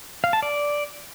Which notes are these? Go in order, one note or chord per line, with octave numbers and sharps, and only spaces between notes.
F5
A5
D5